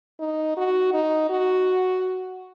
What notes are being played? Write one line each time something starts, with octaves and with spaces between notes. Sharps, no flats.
D#4
F#4
D#4
F#4